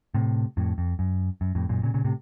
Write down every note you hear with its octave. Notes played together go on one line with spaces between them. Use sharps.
A2 C3
F2 A2
F2
F#2
F#2
F2 A2
F#2 A#2
A#2 C#3
A#2 C#3
A2 C3